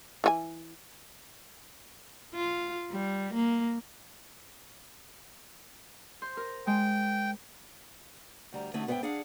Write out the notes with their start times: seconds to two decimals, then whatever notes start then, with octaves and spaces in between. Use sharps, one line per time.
0.24 E3 F4 G#5
2.35 F4
2.91 G3
3.34 A#3
6.22 C5
6.37 A#4
6.67 G#3 G5
8.53 D2 G3 A#5
8.74 D3 A3 C#4 D#4 F#4
8.87 G#2 B3 G#4 C#5 E5 G5
9.03 D4 G#4 F5 F#5